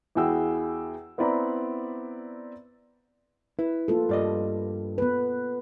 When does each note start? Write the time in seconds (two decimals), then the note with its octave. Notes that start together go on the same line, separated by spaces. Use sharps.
0.15 E2 E4 F#4 G#4 G5 E6
1.18 B3 C4 E4 D5 A#5 B5
3.59 E4 B4
3.88 A#3 F4 A4
4.09 G2 D5 D#5
4.98 B3 B4